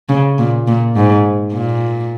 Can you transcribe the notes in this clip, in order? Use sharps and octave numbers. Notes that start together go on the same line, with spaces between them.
C#3
A#2
A#2
G#2
A#2